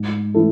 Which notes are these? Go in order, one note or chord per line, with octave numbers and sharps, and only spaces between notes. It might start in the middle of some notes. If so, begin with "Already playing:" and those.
Already playing: G#2
E3 A3 E4 A4